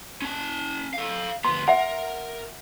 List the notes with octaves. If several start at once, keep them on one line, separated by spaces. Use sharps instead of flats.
C#4 A5
A4 F5
D2 B3 C6
A#4 E5 F#5